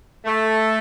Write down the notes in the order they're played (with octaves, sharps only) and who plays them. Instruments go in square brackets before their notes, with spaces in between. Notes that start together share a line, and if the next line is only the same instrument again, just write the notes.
[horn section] A3